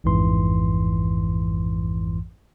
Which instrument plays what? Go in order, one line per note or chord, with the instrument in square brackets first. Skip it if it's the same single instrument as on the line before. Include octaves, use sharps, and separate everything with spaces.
[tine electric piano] A1 F2 G#2 E3 C6